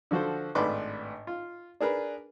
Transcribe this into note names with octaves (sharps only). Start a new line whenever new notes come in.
D3 F3 F#4 A4 C5
G#1 A2 D4 B4 C6 D6
F4
D4 G#4 A#4 B4